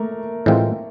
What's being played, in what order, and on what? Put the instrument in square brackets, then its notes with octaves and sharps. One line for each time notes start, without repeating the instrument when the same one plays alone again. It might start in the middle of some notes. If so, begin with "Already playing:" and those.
Already playing: [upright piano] A3 A#3 A#4
[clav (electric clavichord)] A2 E3 G#3 C4 F4